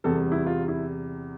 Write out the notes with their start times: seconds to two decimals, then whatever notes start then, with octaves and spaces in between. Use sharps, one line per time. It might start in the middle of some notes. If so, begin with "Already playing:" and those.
0.04 E2 C3 G3 A4
0.32 E4
0.47 F4
0.68 E4